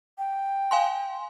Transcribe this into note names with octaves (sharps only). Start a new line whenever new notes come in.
G5
F5 G#5 C6